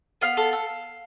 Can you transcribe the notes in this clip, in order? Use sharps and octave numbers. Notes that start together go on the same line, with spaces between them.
B3 F5
A4
A4